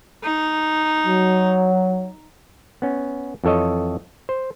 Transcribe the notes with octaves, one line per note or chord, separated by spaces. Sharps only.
D#4
F#3
B3 C#4
F2 E3 A4 C#5 D#5
C5